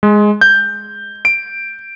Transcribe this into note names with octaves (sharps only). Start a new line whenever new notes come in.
G#3
G6
D7